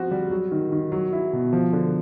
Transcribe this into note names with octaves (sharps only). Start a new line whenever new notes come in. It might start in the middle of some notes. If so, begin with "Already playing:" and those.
Already playing: F3 C4 F#4
G3
F#3
D#3
D#3
F#3
E4
B2
F3
D3